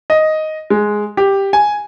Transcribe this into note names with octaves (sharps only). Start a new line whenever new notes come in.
D#5
G#3
G4
G#5